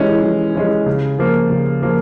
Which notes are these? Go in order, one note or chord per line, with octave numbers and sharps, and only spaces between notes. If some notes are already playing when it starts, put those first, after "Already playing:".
Already playing: E3 G#3 C#4 E4
E3
G#3 C#4 E4
C#3
F3 A#3
C#3
F3 A#3